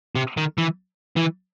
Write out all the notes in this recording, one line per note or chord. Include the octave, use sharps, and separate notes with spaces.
C3
D#3
E3
E3